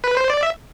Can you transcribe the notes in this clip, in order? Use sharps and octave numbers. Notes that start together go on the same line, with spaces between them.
B4
C5
D5
E5